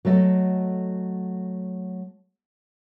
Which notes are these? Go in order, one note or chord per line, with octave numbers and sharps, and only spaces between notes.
F#3 A3 A4 D#5